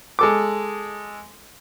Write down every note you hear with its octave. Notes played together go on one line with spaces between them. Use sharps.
G#3 A4 D6